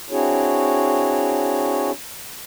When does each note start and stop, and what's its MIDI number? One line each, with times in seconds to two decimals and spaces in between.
0.10 1.91 60
0.10 1.91 62
0.10 1.91 64
0.10 1.91 66
0.10 1.91 68
0.10 1.91 73